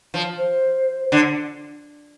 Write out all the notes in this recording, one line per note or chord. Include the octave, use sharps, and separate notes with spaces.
F3
C5
D3